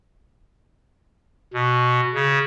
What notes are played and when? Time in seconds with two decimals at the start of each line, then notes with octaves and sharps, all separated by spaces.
1.54 B2
2.14 C#3